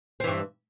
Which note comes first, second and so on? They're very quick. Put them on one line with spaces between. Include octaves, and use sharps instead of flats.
C4 E3 G2